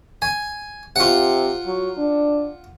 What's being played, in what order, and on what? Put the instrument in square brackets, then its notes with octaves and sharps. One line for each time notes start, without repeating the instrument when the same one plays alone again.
[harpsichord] G#5
[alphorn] C3 [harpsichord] F4 F#5
[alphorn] F#3
D4